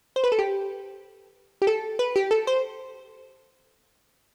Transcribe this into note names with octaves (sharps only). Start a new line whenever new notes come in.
C5
B4
A4
G4
G4
A4
B4
G4
A4
C5